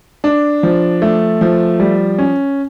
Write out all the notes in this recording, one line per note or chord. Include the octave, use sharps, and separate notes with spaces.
D4
F3
A3
F3
G3
C#4